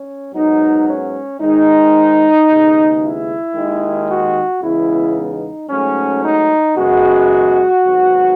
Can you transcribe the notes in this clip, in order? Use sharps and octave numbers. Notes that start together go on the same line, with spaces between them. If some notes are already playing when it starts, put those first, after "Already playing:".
Already playing: C#4
G#2 F#3 B3 D#4
C#4
G#2 D#3 G#3 D#4
D#2 C#3 G#3 B3
E4
D#2 D#3 G#3
F#4
E2 C#3 G#3 B3 E4
D#4
G#2 F#3 A3 C#4
D#4
F#2 C#3 G#3 B3 F#4
G#1 G#2 F#3 B3